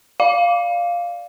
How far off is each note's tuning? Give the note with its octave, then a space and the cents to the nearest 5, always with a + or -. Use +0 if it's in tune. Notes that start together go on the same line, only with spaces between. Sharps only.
D5 +0 F5 +0